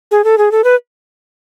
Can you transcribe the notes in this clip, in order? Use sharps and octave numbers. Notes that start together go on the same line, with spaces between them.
G#4
A4
G#4
A4
B4